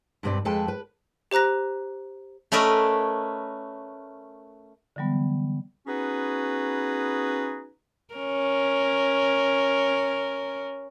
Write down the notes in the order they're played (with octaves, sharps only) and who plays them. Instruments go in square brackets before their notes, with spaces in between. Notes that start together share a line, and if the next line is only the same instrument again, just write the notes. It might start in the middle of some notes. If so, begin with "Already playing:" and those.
[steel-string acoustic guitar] G2 B2 G3 C4 B4 D5
F2 G#3 A4 B4 G5 A5
B4
[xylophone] G4 C5 A#5 F#6 A#6
[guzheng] A3 C#4 A#4 B4 D5 D#5
[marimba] D3 E3 F#3 G3 B3
[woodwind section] B3 C#4 D#4 F#4 G#4 B4
[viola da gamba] C#4 A#4